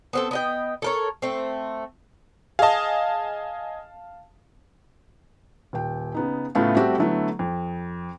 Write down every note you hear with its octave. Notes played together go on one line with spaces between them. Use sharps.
B3 C4 A4
B3 D#5 G5
A4 A#4 C#5
A3 C4
G#4 D#5 F5 A5
D#1 G5
C#3 B3 D#4
A2 C#3 A3 B3 F4
G3 A3 C4 F#4 G4
D3 F#3 A3 B3 E4
F2